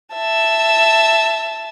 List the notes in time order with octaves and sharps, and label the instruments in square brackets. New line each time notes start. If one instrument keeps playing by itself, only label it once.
[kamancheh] E5 A5